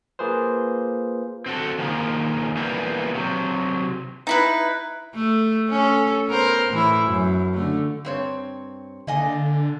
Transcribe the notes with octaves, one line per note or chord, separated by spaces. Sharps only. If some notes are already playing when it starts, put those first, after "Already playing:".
A#3 F4 G#4 B4 C5
C4 F#4 A4
D#3 F3 G#3 A#3
E3 G3 A#3 B3
C3 F#3
D#4 E4 B4
A3
C#4 A4
B3 A#4 C5
A2 E3 E4
F#2
D3 A3
G2 C4 C#5
D3 A#3 D#5 G#5